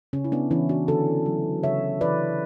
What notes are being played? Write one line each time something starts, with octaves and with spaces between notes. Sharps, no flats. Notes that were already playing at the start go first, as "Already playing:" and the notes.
C#3 C#4
E4
B3 D4
E3 C#4 E4
D4 F#4
D3 F#4 A4
F#3
C#3 C#5 E5
E3 B4 D5